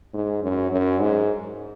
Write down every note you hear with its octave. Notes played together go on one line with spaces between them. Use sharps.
G#2
F#2
F#2
G#2